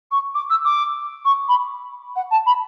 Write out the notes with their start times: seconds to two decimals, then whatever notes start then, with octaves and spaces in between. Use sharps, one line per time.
0.11 C#6
0.34 D6
0.50 E6
0.65 D6
1.25 C#6
1.48 B5
2.16 F#5
2.31 A5
2.46 B5